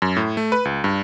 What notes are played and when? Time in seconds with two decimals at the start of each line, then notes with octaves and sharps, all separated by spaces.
0.02 F#2
0.16 A2
0.37 A3
0.52 B4
0.65 C#2
0.84 G2